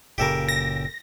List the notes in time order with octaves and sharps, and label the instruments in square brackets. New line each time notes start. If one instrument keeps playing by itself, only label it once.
[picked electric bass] F#1 A#2 C#3 [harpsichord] G4 A4 A#4
[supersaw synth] A#6